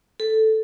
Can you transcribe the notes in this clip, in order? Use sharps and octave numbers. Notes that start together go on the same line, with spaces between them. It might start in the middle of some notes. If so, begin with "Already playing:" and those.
A4